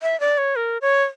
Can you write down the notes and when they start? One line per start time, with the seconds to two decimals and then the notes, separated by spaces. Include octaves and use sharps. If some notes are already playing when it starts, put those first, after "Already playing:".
0.02 E5
0.20 D5
0.38 C#5
0.56 A#4
0.81 C#5